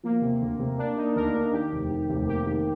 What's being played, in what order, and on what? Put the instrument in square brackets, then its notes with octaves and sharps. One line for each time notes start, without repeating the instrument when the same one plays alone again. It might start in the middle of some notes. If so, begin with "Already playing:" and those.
[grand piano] F3 [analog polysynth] A#3
[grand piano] C3
D2
C3
[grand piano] A#3 [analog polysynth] D4
[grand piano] A#3 [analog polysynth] D#4
[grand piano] D2 [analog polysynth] A#4
[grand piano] A#3
[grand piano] D#3 [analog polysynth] G4
[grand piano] F1
D#3
F1
[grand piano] A#3 [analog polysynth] G4
[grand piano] D#3